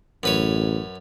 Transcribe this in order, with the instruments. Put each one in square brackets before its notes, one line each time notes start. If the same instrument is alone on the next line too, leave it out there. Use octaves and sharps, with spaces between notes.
[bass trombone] A1 [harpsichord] F#2 B4 C#5